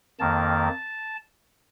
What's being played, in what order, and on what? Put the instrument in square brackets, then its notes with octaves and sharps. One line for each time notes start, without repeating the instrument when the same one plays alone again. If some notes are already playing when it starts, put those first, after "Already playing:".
[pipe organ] F2 D#3 A#3 A5